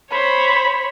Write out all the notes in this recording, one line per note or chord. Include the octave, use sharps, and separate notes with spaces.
C5 C#5 B5